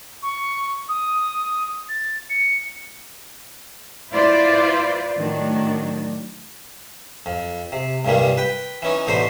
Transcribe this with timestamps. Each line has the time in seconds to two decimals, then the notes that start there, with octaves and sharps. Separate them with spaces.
0.22 C#6
0.88 D#6
1.89 A6
2.30 C#7
4.12 E4 F4 B4 C5 D5
5.17 A2 D#3 F#3 D4
7.26 F2
7.72 C3
8.05 C2 G2 A#2 D#3 G3
8.37 B4 G5
8.82 E3 C#4 D#4
9.07 A1 B2 D3 D#4 C5